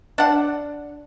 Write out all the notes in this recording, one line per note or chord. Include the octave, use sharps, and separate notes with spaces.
D4 F#5